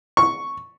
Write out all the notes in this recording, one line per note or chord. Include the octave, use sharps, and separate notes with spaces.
C#6